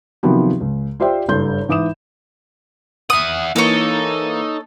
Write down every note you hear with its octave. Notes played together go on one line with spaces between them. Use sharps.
C3 D#3 F3 F#3 B3 G4
C#2
F4 G4 C5 D5 E5 G5
F#1 G2 A4 C6 G6
G#2 E3 D6 D#6 E7
E5 F#5 D#6
E3 A#3 D#4 A4 C#5 A#5